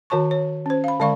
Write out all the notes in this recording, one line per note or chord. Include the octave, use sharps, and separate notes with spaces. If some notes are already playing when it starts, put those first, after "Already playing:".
D#3 F#4 C#5 A5 C#6
C#5
C#4 C5
F5 B5
D3 G#3 D5 F5 B5 C#6